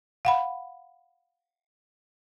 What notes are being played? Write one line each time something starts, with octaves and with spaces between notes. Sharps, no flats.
F5 F#5 B5